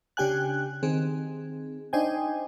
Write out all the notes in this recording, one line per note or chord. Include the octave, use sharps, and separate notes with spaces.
C#3 D4 G4 G5 G#5 F#6
D#3 C4 G#4
D4 D#4 C5 D#5 G5 G#5